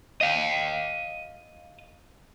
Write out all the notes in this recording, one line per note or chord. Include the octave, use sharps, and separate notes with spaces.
D#5 F5